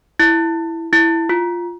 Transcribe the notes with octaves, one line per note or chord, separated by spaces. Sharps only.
E4
E4
F4